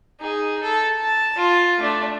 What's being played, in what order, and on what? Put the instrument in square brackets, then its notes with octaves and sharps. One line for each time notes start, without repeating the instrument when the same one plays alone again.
[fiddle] D#4 G#4
A4
A5
F4
A3 D4